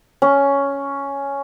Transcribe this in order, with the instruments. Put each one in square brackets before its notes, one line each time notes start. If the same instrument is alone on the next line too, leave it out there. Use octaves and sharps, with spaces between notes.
[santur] C#4